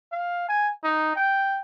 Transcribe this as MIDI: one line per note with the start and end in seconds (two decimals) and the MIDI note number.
0.12 0.46 77
0.49 0.70 80
0.84 1.15 63
1.16 1.60 79